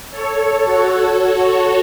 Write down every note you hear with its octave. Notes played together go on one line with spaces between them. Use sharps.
A4 C#5
F#4 A4